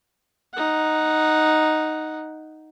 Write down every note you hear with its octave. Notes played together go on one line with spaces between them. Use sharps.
D#4 F#5